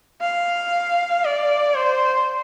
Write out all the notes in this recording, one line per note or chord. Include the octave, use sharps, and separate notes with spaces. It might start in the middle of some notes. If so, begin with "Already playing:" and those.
F5
D5
C5